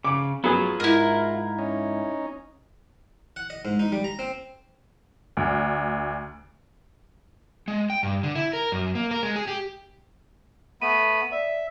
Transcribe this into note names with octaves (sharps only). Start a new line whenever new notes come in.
C#3 D6
F#3 B3 F4 G#4
G#2 E4 A#4
C#4 D#4
F#5
D#5
G#2
D#4
G3
A#5
C4
D2
G#3
G5
G2
D3
E4
A#4
F#2
A#3
A#4
G#3
G#4
G4
A3 B3 B5 D#7
D5 E5